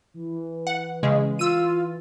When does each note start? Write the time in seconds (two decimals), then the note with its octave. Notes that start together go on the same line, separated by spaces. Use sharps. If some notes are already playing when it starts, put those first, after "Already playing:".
0.14 E3
0.67 F#5
1.03 C#3 G#3
1.39 F4 E6 D#7